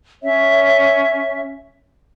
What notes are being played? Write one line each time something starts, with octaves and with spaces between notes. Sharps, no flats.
C#4 C#5 E5